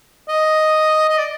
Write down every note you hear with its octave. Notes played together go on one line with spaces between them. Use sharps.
D#5
D#5
D5